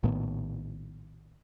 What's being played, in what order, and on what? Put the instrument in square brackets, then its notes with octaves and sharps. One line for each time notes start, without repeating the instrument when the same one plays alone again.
[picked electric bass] A#1 A2 D#3 B3